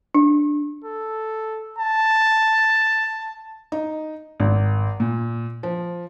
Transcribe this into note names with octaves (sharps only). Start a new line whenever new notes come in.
D4
A4
A5
D#4
G#1
A#2
F3